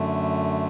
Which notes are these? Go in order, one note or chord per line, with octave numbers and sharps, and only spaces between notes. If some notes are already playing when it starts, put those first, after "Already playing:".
Already playing: F#2 D3 A3